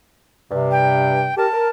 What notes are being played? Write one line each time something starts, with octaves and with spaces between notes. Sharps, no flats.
G2 C3
G5
G4 A#4 A5
A#4